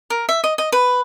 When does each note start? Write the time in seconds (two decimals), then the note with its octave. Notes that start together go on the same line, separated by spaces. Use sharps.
0.10 A#4
0.29 E5
0.44 D#5
0.58 D#5
0.72 B4